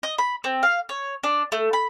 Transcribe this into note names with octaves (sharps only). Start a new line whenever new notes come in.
D#5
B5
C4
F5
C#5
D4
A3
B5